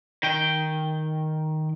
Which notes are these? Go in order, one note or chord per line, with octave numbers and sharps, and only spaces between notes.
D#3 G5